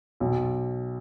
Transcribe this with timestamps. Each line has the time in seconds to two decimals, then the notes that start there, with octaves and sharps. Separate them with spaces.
0.20 B1